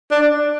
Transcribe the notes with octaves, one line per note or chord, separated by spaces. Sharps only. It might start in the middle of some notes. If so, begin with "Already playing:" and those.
D4